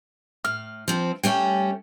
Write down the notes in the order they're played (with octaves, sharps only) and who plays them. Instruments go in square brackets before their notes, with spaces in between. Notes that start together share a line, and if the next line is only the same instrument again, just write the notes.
[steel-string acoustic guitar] A2 [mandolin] F6
[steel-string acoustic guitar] F3 C4
[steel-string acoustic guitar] G3 A3 C#4 [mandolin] C#5 G5